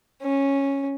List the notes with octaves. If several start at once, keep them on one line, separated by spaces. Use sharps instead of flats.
C#4